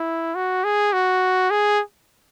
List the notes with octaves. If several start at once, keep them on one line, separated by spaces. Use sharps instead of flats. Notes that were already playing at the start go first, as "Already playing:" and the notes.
Already playing: E4
F#4
G#4
F#4
G#4